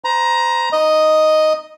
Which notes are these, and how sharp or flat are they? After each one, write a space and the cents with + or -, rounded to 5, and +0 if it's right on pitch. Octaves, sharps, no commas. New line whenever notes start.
C5 -30 A#5 +15
D#4 +0 D#5 +0